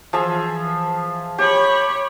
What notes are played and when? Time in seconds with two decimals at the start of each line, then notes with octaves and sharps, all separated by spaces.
0.13 E3 F3 G#4 E5
1.38 G4 C#5 B5 C#6